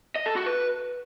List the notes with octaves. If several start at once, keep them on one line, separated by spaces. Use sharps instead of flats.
D#5
A4
F#4
B4